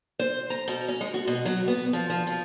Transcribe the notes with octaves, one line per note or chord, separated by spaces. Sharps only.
C5
A#5
B2
C#4
G#3
F#4
B2
F#3
B3
F3
F3
F3